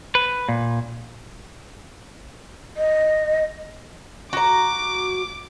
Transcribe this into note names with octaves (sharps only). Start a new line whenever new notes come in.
B4
A#2
D#5
F#4 A#5 D6